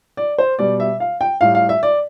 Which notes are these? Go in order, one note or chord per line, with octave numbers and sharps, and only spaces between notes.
D5
C5
B2 G3 D5
E5
F5
G5
A2 G3 F5
F5
E5
D5